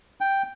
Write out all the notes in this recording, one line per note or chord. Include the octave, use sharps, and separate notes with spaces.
G5